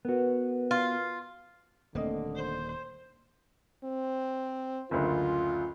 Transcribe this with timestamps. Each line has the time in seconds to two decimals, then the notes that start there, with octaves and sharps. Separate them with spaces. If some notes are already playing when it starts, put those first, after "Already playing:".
0.05 B3 F#4 A#4 B4
0.71 F4
1.95 D#1 D3 A3 A#3 C4 D#5
2.36 C5
3.84 C4
4.91 F#1 D2 F4